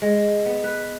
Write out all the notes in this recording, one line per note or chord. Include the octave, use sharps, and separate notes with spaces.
G#3
B3
B4